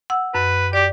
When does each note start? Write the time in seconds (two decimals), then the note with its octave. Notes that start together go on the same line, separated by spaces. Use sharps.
0.10 F#5 E6
0.34 F#2 B4
0.73 G4 D5 D6